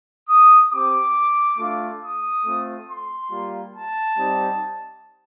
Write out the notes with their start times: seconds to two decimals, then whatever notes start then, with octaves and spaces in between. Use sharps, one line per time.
0.29 D#6
0.72 C4 G4 D6
1.58 A3 D4 F4
2.02 D#6
2.46 A3 C4 F4
2.88 C6
3.31 G3 A#3 F4
3.75 A5
4.18 G3 C4 D#4